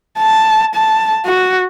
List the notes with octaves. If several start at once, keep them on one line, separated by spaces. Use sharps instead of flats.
A5
A5
F#4